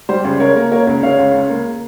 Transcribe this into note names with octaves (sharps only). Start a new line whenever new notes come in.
G3 C5
C#2
C#3 A#4 C#5
A#3
A#3 A#4 C#5
C#2
C#3 C#5 F5
C#2
C#2
A#3